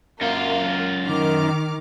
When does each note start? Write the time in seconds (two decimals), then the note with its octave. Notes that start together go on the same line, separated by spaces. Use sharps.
0.21 F#2 A#3 F4 F5
1.07 D#3 D6 F6